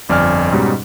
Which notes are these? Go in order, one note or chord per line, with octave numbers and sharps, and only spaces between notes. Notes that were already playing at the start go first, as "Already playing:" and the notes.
G1 F2 D5 G#5 F6
G#2 B2 G3 C#4 D#4